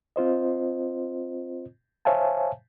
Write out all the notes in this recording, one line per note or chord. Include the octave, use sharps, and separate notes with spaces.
C4 F4 C5 D#5
C5 C#5 E5 F5 G#5 A5